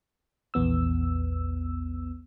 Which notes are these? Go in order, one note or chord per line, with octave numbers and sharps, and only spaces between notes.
A#1 E2 B3 E6